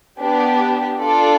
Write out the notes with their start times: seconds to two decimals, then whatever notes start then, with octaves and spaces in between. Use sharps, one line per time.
0.19 B3 D4 G4
1.00 D4 F4 A4 D5